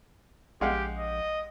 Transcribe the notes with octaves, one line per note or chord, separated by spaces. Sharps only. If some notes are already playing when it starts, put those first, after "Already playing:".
A#1 G#3 G4 F5 F#5
D#5